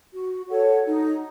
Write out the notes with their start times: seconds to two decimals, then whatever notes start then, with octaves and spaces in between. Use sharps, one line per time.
0.13 F#4
0.49 A4 C#5 F#5
0.85 D#4